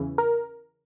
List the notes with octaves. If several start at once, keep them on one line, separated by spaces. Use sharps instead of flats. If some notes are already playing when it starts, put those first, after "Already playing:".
Already playing: E2 C#3 E3
A#4